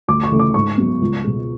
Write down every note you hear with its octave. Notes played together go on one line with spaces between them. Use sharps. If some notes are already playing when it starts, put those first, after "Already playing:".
D2 D6
C#6
C#3 E3 A3
D6
G#2 C#6
F#3 B3
C#2
B2 G#3